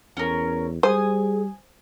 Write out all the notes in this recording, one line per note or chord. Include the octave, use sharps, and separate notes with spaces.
E2 C#4 A#4
G3 G#4 C5 G#5 D#6